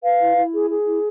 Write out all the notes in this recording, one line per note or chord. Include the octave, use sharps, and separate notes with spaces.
B4 F5
E4
E4
G#4
G#4
E4